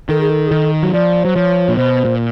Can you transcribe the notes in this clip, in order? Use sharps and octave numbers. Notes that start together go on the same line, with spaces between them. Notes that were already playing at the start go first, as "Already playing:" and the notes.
D#3 A4
G#4
A4
G#4
D#3 A4
F#3
F3 D5
F#3 C5
F3 C#5
A#2
B2 C5
A#2